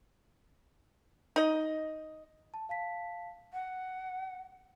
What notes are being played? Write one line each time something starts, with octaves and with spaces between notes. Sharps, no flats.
D#4 D#5
A5
F5 A5 B6
F#5